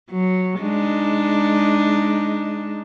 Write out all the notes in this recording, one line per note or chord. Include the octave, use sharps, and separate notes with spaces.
F#3
G#3 D4 D#4